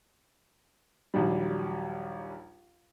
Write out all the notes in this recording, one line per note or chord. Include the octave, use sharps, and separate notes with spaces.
A#1 D#2 F#3 G3